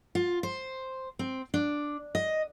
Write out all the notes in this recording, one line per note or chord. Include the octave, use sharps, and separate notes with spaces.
F4
C5
C4
D4
D#5